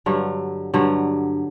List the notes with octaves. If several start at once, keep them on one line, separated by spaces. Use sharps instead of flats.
G2 D3 F#3
G2 D3 F#3